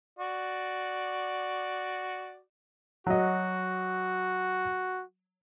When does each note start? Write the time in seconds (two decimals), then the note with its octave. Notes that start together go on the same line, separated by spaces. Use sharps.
0.19 F#4 D5
3.07 F#3 F#4 D#5